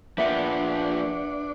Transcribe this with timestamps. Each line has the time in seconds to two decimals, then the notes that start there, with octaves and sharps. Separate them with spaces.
0.18 F3 A#3 D4 B4 E5 F#5 G5